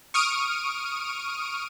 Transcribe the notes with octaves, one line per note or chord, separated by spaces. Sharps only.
C#6 D#6 F6 D7 D#7